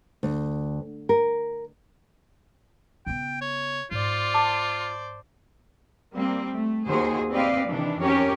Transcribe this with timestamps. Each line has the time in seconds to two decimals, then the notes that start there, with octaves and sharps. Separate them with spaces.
0.23 D2
1.09 A#4
3.06 C#3 B3 G5
3.41 C#5
3.91 G#2 F4 C5 D5
4.34 A5 D6
6.14 G3 A#3 C4
6.51 A3
6.87 D#2 F#4 G#4 C5
7.31 C4 G4 B4 D5 D#5 F5
7.67 C3 D#3 E3 D4
7.99 F2 C#4 G4 A#4 C#5